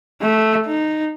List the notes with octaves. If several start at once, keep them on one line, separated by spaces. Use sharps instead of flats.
A3
D#4